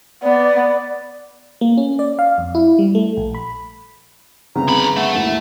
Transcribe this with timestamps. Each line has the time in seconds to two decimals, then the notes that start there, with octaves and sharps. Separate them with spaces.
0.23 B3 D5
1.61 A#3
1.78 C#4
1.99 D5
2.19 F5
2.38 F2
2.55 E4
2.79 G3
2.95 A3
3.17 A#1
3.35 B5
4.56 G1 C#3 B3 C4 A#5
4.68 D3 B5
4.96 A3 F#5
5.14 D#2 G#2 E4